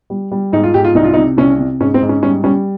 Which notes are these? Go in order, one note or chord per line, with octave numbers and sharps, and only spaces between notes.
G3
G3
G#2 D#4
F4
G#2 G4
F4
C2 D#4
F4
D#4
C3
C2 C#4
C3
G#2 C#4
C4
G#2
C#4
G3 C#4
G3 C#4